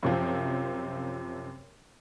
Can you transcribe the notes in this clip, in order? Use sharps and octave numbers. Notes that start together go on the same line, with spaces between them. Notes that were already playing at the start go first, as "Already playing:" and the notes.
F#2 C3 F3